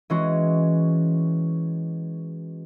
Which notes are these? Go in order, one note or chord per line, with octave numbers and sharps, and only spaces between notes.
E3 G#3 C#4 F#4